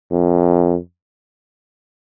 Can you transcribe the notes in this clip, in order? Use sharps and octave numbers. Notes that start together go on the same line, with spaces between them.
F2